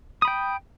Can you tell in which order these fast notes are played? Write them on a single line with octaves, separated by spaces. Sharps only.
D#6 B5 G5